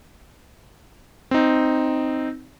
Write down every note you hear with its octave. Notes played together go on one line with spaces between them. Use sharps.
C4 D#4